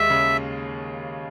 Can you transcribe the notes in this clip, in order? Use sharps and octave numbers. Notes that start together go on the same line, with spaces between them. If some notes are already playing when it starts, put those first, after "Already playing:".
Already playing: D#2 G#3 E5
C#3